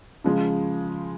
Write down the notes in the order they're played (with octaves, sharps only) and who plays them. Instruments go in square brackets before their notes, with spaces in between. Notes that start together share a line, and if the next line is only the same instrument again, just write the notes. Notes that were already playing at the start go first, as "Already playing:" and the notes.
[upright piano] C#3 F3 G#3